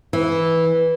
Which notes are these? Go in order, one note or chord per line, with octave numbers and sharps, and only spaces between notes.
E3